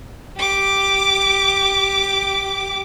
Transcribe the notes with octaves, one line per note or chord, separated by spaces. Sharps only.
G4 D6